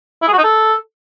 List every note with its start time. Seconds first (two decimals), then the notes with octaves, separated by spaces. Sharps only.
0.22 E4
0.28 G#4
0.33 F#4
0.38 D#4
0.44 A4